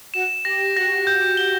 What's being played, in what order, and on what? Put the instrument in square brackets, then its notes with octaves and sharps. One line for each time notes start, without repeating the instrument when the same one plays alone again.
[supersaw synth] F#4 [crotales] E7
[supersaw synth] G4 [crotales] A#6
[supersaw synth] F#4 [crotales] A#6
[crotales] G6
G7